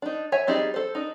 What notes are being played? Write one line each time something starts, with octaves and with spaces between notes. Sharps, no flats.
D4 D#4
C#5 E5 G#5
G3 C4 D#4 G#4 D5
A4 C5
D4 D#4